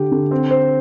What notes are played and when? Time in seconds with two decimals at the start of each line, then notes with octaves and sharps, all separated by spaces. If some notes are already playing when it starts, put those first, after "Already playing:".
Already playing: D3 G4
0.12 D3
0.31 C4
0.51 C5